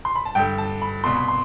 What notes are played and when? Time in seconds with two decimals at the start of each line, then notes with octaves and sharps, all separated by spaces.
0.05 C6
0.16 B5
0.25 A5
0.35 G2 D3 G5
0.58 A5
0.82 B5
1.04 C2 B2 C6
1.16 B5
1.28 C6